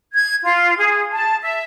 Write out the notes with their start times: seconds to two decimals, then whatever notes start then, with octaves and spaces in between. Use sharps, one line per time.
0.13 G#6
0.42 F4
0.77 G#4
1.13 A5
1.41 E5